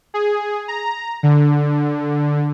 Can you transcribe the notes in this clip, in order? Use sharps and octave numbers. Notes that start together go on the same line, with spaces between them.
G#4
A#5
D3